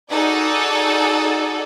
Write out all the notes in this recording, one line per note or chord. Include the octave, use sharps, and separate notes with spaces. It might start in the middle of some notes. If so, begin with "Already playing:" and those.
D#4 F#4 G#4 A4 D5 F#5